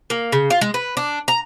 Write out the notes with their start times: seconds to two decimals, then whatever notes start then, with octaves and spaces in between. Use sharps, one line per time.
0.10 A#3
0.32 C#3
0.50 F4
0.61 G#3
0.74 B4
0.97 D4
1.28 A#5